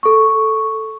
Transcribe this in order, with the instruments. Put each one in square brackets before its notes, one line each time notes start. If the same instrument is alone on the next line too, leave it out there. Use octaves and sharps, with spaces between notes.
[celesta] A4 C#6